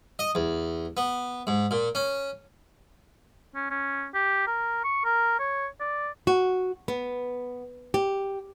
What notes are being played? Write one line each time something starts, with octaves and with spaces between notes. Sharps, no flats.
D#5
E2
B3
G#2
A#2
C#4
C#4
C#4
G4
A#4
C#6
A#4
C#5
D5
F#4
B3
G4